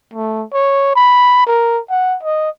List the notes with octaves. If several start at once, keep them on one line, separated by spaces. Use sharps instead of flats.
A3
C#5
B5
A#4
F#5
D#5